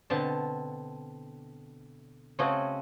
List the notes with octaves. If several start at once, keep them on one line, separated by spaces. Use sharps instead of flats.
B2 D3 C4 A5
C#3 A3 C4 C#4 F#4 D#5